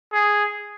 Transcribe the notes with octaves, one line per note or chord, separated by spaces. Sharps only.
G#4